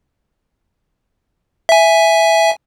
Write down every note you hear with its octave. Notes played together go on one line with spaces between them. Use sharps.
E5 G#5